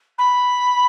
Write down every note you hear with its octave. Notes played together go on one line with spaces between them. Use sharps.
B5